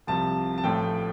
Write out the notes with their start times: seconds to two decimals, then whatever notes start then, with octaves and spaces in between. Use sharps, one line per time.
0.07 C2 C3 F3 A5
0.58 A5
0.64 A1 A2 F3 A3 G5